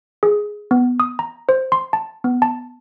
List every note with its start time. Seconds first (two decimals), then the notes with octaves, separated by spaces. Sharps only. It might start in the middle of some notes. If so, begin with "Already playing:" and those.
0.23 G#4
0.71 B3
1.00 D#6
1.19 A#5
1.49 C5
1.72 C6
1.93 A5
2.24 B3
2.42 A5